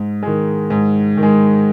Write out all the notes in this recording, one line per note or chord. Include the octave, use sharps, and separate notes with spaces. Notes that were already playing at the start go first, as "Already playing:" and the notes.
Already playing: G#2
D#3 G#3
G#2
D#3
G#3